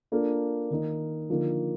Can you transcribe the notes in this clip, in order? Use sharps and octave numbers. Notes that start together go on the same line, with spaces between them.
A#3 D4 F4 A4
D#3 A#3 D#4
D3 F3 A#3 D#4